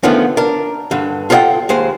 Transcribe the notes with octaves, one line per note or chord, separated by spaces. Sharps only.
D3 D#3 F3 A3 B3 C#4
D4 A#4
G2 D3
F4 A4 B4 D#5 F#5 G5
D#2 G#3 C5